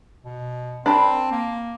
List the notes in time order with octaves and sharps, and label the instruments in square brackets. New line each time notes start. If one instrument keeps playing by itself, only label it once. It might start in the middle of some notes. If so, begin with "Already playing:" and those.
[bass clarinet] B2
[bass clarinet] C4 [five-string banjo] D4 A#4 B5
[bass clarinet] A#3